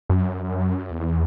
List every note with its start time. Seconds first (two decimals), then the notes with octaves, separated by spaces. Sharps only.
0.10 F#2
0.91 E2